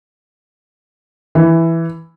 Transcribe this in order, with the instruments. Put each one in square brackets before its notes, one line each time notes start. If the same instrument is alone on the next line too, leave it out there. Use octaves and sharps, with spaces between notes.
[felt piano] E3